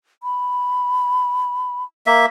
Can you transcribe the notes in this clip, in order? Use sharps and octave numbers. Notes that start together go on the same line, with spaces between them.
B5
A#3 E5